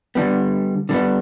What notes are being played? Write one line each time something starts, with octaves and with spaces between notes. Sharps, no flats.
D3 G3 B3
D3 G3 B3